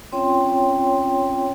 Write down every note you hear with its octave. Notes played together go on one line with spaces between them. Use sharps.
C4 C#4 F4 C#5 G5 C6